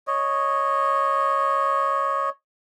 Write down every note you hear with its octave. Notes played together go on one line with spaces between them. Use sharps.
C#5 D#5